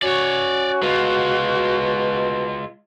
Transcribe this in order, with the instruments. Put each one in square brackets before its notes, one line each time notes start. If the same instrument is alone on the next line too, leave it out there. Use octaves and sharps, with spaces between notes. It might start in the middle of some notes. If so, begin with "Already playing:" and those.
[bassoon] C#4 [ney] F#4 [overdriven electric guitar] C#5 D5
[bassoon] B2 [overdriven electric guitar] G#3 F4